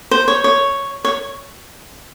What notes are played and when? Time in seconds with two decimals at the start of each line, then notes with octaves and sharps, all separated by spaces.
0.11 C5
0.28 C#5
0.44 C#5
1.04 C#5